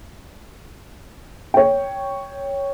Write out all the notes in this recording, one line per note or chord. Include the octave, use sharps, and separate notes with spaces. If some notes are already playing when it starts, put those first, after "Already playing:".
C#5 G5